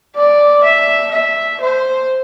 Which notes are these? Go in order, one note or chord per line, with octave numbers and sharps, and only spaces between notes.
D5
E5
E5
C5